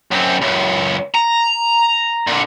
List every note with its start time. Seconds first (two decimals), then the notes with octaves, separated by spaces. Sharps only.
0.11 F#2 C4
0.41 C#2 F#2
1.14 A#5
2.27 A#2 D3